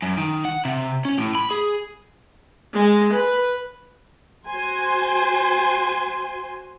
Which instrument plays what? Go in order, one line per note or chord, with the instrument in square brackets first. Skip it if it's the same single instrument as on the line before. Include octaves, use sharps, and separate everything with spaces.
[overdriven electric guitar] F#2
D#3
F#5
C3
C#4
A2
B5
G#4
[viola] G#3
B4
[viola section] F#4 C5 G#5 C6